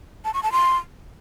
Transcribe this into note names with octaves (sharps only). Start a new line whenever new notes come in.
A5
C#6
A5
C6